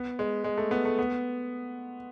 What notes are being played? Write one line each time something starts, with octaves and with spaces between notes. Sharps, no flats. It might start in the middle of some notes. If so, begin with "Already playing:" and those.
Already playing: B3
G#3
G#3
A3
B3
A3
B3